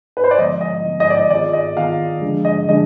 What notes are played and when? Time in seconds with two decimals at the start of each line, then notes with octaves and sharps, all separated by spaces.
0.17 B4
0.24 C5
0.31 D5
0.38 D3 F3 G#3 B3 D#5
0.61 D#5
0.84 D3 F3 G#3 B3
1.00 D#5
1.10 D5
1.16 D#5
1.30 D#3 B3 F4 G#4 D5
1.53 D#5
1.76 D#3 B3 F4 G#4 F5
2.22 D3 F3 G#3 D4 G#4
2.45 D#5
2.68 D3 F3 G#3 D4 G#4 D#5